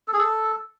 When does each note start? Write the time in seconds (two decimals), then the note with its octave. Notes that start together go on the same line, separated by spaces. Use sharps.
0.08 A4
0.13 G#4
0.19 A4